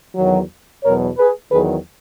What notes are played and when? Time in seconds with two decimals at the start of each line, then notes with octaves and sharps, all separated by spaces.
0.16 E2 D#3 F#3
0.84 E2 B2 F#3 A#4 C#5
1.18 G#4 B4
1.51 E2 D#3 F#3 G#4 B4